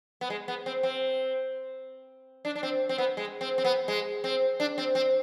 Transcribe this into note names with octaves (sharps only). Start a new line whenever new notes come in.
B3
G#3
B3
C4
C4
D4
D4
C4
C4
B3
G#3
C4
C4
B3
G#3
C4
D4
C4
C4